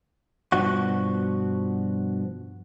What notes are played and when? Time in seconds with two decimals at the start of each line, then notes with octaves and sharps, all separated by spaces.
0.52 G2 B2 F3 F#4